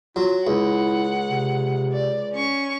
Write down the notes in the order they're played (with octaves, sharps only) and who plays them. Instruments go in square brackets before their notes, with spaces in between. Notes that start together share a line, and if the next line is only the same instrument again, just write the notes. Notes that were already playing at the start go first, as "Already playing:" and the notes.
[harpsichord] F#3 [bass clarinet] F4
[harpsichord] C#2 [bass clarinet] E4 [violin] F#5
[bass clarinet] C3
[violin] D5
C#4 C#6